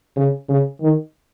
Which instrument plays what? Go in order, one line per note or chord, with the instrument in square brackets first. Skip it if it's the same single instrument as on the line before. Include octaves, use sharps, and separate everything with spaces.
[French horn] C#3
C#3
D#3